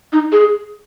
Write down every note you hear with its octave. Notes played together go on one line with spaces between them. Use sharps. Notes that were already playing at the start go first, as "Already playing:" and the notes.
D#4
G#4